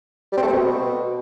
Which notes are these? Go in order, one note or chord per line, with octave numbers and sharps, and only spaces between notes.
G3
C4
A3
C4
B2